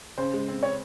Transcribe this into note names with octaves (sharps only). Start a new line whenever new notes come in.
C#3 C5
G#3
C4
C#5